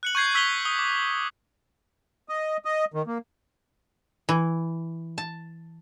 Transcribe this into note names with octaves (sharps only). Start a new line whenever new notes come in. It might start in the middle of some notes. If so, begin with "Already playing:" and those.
F#6 C#7 F#7
C#6 G6 G#6 C7
C#6 E6 B6 C7 F7 G7
D#6 G7
D6
D#5
D#5
D#3
A#3
E3
A5